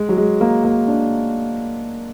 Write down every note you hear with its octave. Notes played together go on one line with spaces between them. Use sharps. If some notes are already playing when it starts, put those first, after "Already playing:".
Already playing: G#3
F#3
G#3
A#3
A#3
D4